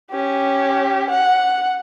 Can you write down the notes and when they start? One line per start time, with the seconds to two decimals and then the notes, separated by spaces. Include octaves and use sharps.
0.11 C#4 G4
1.10 F#5